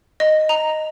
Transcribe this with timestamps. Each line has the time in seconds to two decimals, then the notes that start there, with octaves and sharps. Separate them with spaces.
0.20 D#5
0.49 A#5